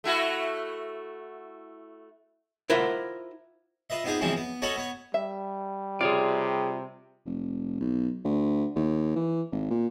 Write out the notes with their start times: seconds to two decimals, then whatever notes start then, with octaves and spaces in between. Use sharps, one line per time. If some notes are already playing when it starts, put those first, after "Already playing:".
0.04 A3 E4 F#4
2.70 E4 F4 A#4 C5 E5 F#5
3.90 F4 B4 D#5 E5
4.04 B3 C4 D#4 F4 G4 G#4
4.21 B2 E3 F3 G#3 C4 C#4
4.36 B3
4.62 C#4 F#4 A4 C#5 D#5 B5
4.76 B3 C#5
5.14 G3 E5
6.01 C3 F4 G#4 C#5 D5
7.26 F1
7.80 B1
8.25 D2
8.76 D#2
9.15 E3
9.51 G#1
9.70 A#2